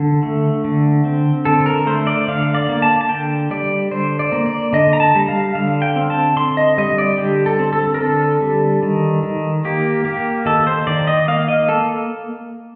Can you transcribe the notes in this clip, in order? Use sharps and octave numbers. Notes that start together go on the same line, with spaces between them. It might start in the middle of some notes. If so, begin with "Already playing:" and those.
Already playing: D3 A4
A3
D3
C4
D3 A4
A#4
A3 C5
D5
D3 F5
D5
A#3
A5
A5
D3 G5
G3 D5
D3 C5
D5
A#3
D5
D3 D#5
A#5
A5
G3
F5
D3 F5
G5
C4
A5
D3 C6
D#5
G3 D#5
D5
D3 G4
A4
C4
A4
A#4
D3 A4
G3
D#3
D#3
A#3 G4
A#3 G4
D#3 A4
C5
D#3 D5
D#5
A#3 F5
D#5
A#3 A4